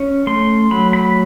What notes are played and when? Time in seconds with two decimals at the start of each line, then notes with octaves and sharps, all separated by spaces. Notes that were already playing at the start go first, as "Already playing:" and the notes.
Already playing: C#4
0.27 A3 C6
0.71 F#3 B5
0.93 B5